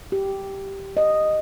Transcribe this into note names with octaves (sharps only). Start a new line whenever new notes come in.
G4
D#5